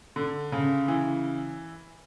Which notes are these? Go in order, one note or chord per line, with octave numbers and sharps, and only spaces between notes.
D3
C#3
E3